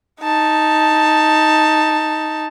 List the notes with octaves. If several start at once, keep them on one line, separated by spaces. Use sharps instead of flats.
D#4 A5